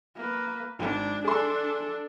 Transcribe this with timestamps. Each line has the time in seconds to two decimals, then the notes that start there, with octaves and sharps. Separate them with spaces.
0.16 A#3 B4
0.79 G#1 D4
1.24 D4 G#4 A4 C6